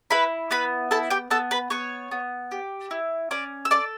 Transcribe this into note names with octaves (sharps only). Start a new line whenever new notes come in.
E4 B4 B5
B3 B4 B5
E4 A4 A5
G4 G5
B3 A4 A5
B4 B5
B3 C#5 C#6
B3
G4
E4
C#4 D5 D6
E6
A4 D5 D6